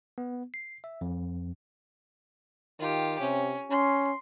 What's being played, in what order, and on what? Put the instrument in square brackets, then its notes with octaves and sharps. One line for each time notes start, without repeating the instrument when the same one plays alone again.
[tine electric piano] B3
C7
E5
F2
[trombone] D#3 [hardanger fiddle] F4 G4
[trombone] C3 [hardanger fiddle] C#4
[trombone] C#4 [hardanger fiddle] C6